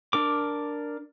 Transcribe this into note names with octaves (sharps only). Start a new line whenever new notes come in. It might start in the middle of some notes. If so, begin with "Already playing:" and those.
D4 A#4 D6